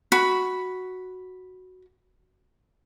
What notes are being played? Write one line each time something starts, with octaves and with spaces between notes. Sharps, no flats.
F#4 B5